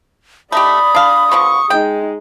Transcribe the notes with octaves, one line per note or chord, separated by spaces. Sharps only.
A3 D#4 G4 D5 B5 D#6
D4 F5
D3 F3 B3 C#6
G#3 D#4 G5